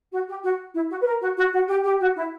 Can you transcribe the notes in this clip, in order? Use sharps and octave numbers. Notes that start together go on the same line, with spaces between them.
F#4
G4
F#4
E4
F#4
B4
A#4
F#4
F#4
F#4
G4
G4
F#4
E4